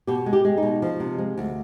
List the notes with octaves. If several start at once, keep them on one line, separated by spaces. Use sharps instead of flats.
B2 G4
G#3
G4
G#3
D#4
B2
F3
C3
G#3
D2